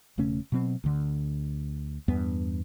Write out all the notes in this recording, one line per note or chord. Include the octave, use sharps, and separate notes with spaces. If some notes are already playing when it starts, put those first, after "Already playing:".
E1 C#3 A3 C#4
B2 F#3 C4
D2 D3
E2 G2 B3